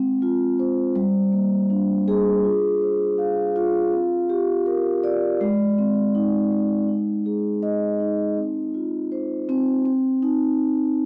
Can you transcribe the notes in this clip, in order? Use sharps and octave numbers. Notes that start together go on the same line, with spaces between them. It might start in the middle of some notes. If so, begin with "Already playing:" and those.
Already playing: G#3 C4
F4
C5
G3
A#3
D4
G#4
F4
C5
F5
F4
C4
G4
A#4
D5
G#3
C4
D#4
G#3
D#4
G#4
D#5
D#4
C4
F4
C5
C4
C4
D#4